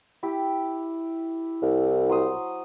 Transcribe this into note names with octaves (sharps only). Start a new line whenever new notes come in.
E4 G4
C2
F#3 C5 D#6